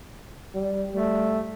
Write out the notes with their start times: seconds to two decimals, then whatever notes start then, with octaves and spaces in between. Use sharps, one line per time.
0.55 G3
0.95 G3 A3